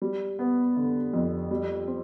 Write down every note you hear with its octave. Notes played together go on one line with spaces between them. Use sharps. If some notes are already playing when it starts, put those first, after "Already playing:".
G3
B3
D3
F2
G3
C4